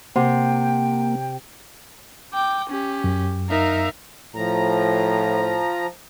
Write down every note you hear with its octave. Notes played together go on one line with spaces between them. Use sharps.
C3 A#3 C5 F#5 G5 C6
G5 D6
C#4 G4
F#2
D#4 A#4 E5 F5
A2 F3 A#5